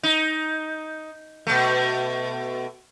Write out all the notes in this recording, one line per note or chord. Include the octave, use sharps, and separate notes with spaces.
D#4
B2 A3